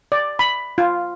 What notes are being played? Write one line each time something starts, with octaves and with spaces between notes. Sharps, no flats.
D5
B5
F4